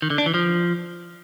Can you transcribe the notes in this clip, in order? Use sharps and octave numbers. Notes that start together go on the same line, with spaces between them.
D#3
D3
D4
E3
F3